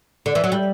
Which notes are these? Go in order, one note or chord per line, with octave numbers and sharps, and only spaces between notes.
D3
E3
F#3
G3